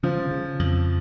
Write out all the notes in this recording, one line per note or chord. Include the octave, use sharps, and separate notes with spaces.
C#3 F3
C#3
F2